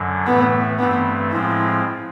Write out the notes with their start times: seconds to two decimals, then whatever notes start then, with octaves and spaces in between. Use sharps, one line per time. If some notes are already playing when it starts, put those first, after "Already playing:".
Already playing: F#2 D3 F#3
0.26 A2 E3 A3 B3
0.79 G2 E3 A3 B3 C4
1.32 A2 F3 G#3 C4 E4